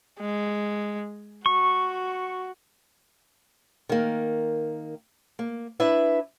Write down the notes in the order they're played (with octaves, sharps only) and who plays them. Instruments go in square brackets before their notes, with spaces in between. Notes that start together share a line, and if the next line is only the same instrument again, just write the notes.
[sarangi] G#3
[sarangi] F#4 [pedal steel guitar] C#6
[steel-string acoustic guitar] D#3 A#3
A#3
D4 E4 B4 E5